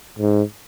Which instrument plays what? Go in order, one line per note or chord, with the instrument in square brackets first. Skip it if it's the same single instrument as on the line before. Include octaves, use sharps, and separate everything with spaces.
[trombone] G#2